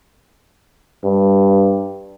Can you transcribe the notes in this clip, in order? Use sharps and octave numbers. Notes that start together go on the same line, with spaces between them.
G2